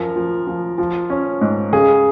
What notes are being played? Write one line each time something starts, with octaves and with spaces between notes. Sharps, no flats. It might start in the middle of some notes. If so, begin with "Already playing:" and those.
Already playing: F#2 F3 A#4
F3
F3
F3
C#4
G#2
C#3 G#4